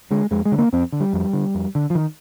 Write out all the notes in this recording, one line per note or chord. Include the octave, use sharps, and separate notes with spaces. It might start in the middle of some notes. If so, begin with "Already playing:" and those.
D3 G#3
F2 G#3
G#3
D3
A#3
F2 C4
D3
G3
F2
D3
F2
D3
F3
D#3